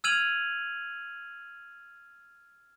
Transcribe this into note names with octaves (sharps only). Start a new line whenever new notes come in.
E6 F6 G#6 D#7 F7 F#7